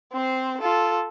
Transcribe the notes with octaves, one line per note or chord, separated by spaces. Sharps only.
C4 C5
F4 A4